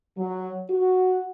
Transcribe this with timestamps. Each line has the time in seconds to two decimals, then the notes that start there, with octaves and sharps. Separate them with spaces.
0.17 F#3
0.70 F#4